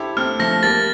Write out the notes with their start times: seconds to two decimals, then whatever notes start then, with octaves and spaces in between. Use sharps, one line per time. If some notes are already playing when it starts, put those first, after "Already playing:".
Already playing: E4 G4 A4 C5
0.17 A3 C4 F6
0.39 F3 A3 A#6
0.62 G3 A#3 A6